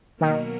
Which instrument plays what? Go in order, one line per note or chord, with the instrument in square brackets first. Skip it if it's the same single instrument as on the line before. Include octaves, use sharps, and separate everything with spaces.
[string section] B2 F#3 A#3 [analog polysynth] D#3